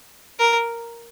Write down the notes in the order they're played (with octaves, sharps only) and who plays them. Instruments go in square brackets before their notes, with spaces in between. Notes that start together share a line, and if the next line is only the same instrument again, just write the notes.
[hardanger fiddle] A#4